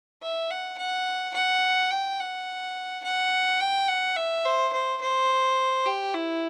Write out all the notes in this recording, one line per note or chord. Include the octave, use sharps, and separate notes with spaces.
E5
F#5
F#5
F#5
G5
F#5
F#5
G5
F#5
E5
C5
C5
C5
G4
E4